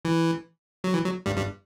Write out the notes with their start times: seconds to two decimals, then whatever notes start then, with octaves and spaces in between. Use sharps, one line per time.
0.05 E3
0.84 F#3
0.94 E3
1.04 F#3
1.26 G2 G3
1.37 G2 G3